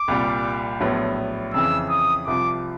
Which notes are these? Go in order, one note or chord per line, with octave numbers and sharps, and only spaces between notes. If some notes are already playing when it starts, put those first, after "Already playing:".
Already playing: D6
C2 A#2 G3
A#1 A2 F#3 B3
F2 C#3 E3 E6
D#6
C2 C3 F3 D6